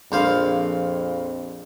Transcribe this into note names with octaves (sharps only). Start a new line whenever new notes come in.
A#1 F2 C5 F5